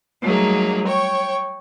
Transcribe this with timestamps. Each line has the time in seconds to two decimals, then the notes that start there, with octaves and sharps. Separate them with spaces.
0.22 F#3 G3 A3 A#3 D#4 G#4
0.86 C#5 G5 C#6